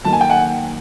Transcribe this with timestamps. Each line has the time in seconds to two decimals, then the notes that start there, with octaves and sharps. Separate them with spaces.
0.04 D#3 F#3 A#3 A5
0.13 G#5
0.21 G5
0.30 F#5 G#5